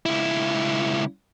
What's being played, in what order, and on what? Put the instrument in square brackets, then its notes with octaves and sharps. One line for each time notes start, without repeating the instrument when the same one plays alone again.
[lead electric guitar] C#2 E4